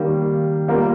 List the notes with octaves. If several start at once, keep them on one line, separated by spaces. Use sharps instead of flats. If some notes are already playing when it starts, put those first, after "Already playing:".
Already playing: D#3 G3 A#3
G3 A#3 F4 A#4